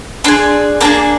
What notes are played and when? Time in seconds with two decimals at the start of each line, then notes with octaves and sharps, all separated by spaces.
0.24 D4 G#4 C6
0.80 A#3 D4 G#4 D6